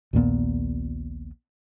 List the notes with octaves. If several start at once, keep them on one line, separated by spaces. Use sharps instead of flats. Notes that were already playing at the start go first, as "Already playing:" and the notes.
A#1 D#2 A#2 B3